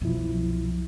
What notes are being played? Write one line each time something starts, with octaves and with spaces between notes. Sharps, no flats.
C2 F#2 B2 F3 E4